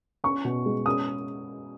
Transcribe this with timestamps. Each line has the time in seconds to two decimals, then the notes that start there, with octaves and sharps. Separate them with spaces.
0.24 C#4 C#6
0.45 B2
0.66 G#3
0.86 C#4 D#6